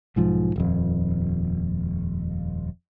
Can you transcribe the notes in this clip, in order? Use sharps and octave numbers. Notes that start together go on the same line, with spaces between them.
B1 G#2 F3
D#1 F2